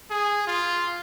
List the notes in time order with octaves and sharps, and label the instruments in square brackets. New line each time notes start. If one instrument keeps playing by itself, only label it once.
[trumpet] G#4
F4